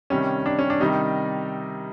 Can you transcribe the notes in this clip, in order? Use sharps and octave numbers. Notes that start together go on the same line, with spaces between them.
C3 D#3 G3 C#4
D4
C#4
D4
C3 D#3 G3 D#4